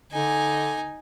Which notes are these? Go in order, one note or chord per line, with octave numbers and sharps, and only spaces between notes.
D3 D#4 G#5